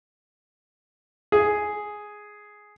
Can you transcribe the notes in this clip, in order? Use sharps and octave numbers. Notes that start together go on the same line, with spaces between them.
G#4